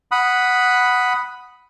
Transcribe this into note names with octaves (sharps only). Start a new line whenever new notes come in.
F#5 B5 D#6